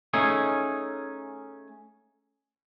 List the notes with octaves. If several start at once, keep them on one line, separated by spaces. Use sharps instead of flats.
A3 C#4 D#4 G#4